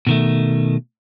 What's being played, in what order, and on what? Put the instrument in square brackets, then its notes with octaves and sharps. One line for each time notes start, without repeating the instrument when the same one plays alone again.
[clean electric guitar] B2 D#3 A3